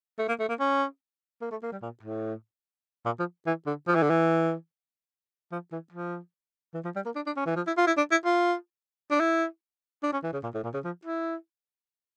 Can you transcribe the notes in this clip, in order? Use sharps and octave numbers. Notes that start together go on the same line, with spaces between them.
A3
A#3
A3
A#3
C#4
A#3
A3
A#3
G3
A#2
A2
A#2
F3
E3
D3
F3
E3
D3
E3
F3
E3
F3
E3
F3
G3
A#3
D4
D4
C#4
E3
F3
E4
F4
E4
D4
E4
F4
D4
E4
D4
C#4
E3
C#3
A#2
A2
A#2
C#3
F3
E4